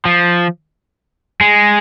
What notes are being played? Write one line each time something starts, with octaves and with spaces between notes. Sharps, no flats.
F3
G#3